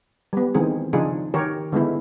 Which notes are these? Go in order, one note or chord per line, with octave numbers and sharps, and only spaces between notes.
G3 B3
D#3 E3 G#3 C4 G#4
C#3 F3 D4 D#4 F4 G#4
D#3 G4 A#4 C#5
D3 G#3 B3 E4